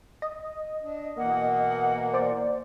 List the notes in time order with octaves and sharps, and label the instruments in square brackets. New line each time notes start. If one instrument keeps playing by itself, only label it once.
[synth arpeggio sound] D#5
[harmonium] D4
[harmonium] B2 E3 [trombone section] A#3 [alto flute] F#5
[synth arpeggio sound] C5 D5